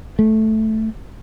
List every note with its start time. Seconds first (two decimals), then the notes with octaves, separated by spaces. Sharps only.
0.19 A3